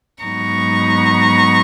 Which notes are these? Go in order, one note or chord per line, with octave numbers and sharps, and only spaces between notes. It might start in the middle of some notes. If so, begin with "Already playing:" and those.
G#2 F#3 B3 D#4 A#5 C#6